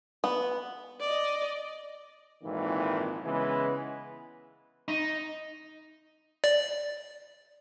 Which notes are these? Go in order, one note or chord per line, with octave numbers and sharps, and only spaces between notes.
B3
D5 D#5
G#1 F2 A#2 D#3 E3
C#3 E3 G#3 B3 B4
D#4
D5